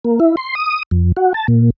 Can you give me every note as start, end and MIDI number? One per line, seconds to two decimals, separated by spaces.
0.04 0.19 58
0.20 0.36 64
0.37 0.55 84
0.55 0.83 87
0.91 1.12 41
1.17 1.33 66
1.34 1.47 81
1.48 1.70 46